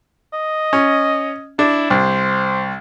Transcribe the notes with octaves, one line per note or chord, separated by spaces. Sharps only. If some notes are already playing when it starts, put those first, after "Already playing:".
D#5
C#4
D4 E4
C2 C5